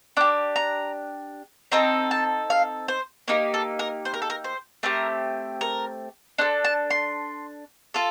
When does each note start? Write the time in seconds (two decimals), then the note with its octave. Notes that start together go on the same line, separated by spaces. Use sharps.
0.17 D4 G4 D6
0.56 A#5
1.72 C4 D#4 A4 A#5
2.11 A5
2.50 F5
2.88 C5
3.28 A#3 D#4 G4 A#4
3.54 A4
3.79 A#4
4.05 C5
4.14 A#4
4.22 A4
4.30 A#4
4.44 C5
4.83 A3 C4 G4 A#4
5.61 A#4
6.38 D4 A4 C5
6.65 A5
6.90 C6
7.94 F4 A4